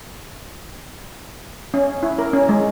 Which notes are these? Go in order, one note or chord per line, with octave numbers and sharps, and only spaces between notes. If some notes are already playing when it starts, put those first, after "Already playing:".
C#4
E4
A#4
C#4
G#3